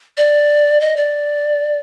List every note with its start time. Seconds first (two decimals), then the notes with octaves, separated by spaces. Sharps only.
0.17 D5
0.81 D#5
0.97 D5